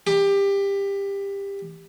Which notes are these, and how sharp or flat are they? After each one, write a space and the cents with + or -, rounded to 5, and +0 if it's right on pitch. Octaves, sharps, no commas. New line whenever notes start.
G4 +20